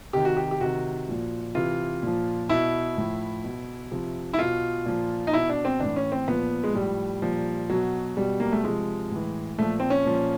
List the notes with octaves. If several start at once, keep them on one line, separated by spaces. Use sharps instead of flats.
C3 D#3 G4
F#4
G4
G4
C3 D#3 F#4
A#2 F3
C3 E3 F4
A#2 F3
B2 E4
A2 F3
B2
C3 F3
E4
B2 F4
A#2 F3
D#4
B2 E4
D4
C4
A2 E3 D4
C#4
C4
A#2 F3 B3
G#3
A2 F3 G3
A#2 F3
B2 F#3
B2 G3
A#3
A3
C3 F3 G#3
A2 E3
A#2 F3 A3
C4
C#4
A#2 F3